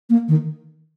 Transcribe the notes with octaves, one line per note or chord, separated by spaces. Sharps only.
A#3
D#3